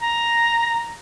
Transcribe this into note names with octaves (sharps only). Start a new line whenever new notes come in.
A#5